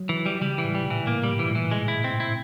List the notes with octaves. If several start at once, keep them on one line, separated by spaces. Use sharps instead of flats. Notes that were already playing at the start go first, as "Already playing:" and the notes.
Already playing: F#3
E3
G3
C#3 G3
E3
A2
G3
A#2 E3
A2 A#3
G3
G#2
E3
A#2
A2
E3
G#3
E4
C4
E4